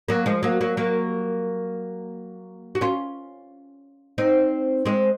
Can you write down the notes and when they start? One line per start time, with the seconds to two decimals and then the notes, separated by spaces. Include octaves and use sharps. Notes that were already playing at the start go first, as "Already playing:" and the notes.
0.08 F#3 A#3
0.26 F3 G#3
0.43 F#3 A#3
0.61 F#3 A#3
0.77 F#3 A#3
2.75 F#4
2.81 C#4 F4
4.18 C4 D#4
4.85 G#3 C4